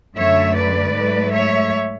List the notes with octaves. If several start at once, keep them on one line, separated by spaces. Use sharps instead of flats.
F#2 D3 A3 C#5 E5
B4 D5
G#2 F#3 A3
C#5 E5